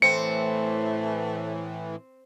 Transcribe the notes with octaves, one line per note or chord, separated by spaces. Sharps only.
A2 E3 A3 C4 C#7